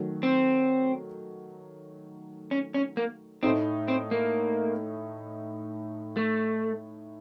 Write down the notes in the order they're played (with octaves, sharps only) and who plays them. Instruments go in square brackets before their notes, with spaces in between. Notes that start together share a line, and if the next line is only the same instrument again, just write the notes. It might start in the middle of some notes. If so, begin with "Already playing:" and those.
Already playing: [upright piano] D#3 F#3 A3
[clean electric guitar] C4
C#4
C#4
A#3
[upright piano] A2 A3 D#4 [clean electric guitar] C4
[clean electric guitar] C4
A#3
A3